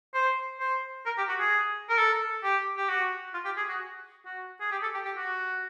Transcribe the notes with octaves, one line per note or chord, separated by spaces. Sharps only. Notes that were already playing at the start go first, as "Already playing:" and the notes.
C5
C5
A#4
G4
F#4
G#4
A#4
A4
G4
G4
F#4
F4
G4
G#4
F#4
F#4
G#4
G4
A4
G4
G4
F#4